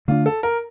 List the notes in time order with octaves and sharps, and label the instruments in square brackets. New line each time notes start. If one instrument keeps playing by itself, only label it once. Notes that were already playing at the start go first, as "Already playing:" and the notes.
[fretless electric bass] D3 A3 D4 [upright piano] F4
[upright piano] A4
A#4